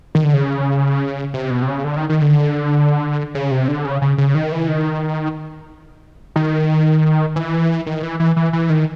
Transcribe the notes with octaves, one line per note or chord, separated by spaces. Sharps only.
D#3
D3
C#3
C3
B2
C3
C#3
D3
D#3
D#3
D3
C#3
C3
D3
C#3
C#3
C#3
D#3
E3
D#3
D#3
E3
D#3
E3
E3
E3
E3
D#3